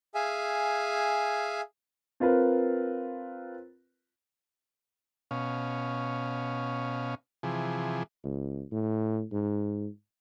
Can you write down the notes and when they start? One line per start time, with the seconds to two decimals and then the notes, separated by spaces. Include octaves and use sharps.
0.15 G#4 E5 F5 G#5
2.20 C4 F4 A#4 B4
5.31 B2 C#4 F5
7.43 C3 E3 F3 G#4
8.24 C#2
8.72 A2
9.32 G#2